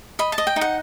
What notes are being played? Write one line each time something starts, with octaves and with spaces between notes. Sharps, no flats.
D#5 B5
A5
D#5
G5
D#4
F#5